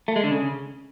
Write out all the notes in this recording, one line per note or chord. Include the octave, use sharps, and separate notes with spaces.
A3
G#3
D3
C#3